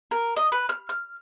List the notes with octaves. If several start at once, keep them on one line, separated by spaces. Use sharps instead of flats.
A#4
D#5
B4
F6
F6